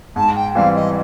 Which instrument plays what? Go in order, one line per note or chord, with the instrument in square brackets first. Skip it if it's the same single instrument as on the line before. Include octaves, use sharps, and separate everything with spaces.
[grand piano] G#2 [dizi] A5
[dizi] G5
[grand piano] E3 G3 C4 [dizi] F5
[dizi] D#5